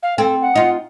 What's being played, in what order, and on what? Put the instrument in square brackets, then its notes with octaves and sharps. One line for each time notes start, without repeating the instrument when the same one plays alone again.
[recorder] F5
[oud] C4 [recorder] A4
[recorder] F#5
[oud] D#4 F4